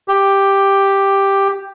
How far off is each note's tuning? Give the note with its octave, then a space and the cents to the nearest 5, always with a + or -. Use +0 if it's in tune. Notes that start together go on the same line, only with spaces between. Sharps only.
G4 +5